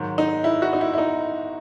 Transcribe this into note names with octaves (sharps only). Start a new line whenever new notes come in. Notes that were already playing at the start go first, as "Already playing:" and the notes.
Already playing: G#2 D#3 F#3
D#4
E4
F#4
D#4
E4
E4
D#4